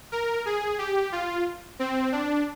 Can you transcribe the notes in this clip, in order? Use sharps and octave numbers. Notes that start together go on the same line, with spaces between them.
A#4
G#4
G4
F4
C4
D4